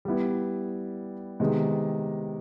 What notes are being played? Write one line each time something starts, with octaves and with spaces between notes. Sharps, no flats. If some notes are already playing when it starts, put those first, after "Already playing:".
G3 B3 E4
C3 D#3 G#3 B3